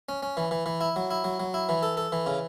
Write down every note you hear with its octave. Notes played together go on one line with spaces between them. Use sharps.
C#4
C#4
E3
E3
E3
E4
F#3
E4
F#3
F#3
E4
E3
A4
A4
E3
C#3